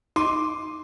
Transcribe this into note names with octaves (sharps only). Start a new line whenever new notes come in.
D#4 C6 D6